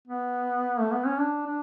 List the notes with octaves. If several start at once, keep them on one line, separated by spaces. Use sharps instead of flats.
B3
A3
B3
C#4
D4
D4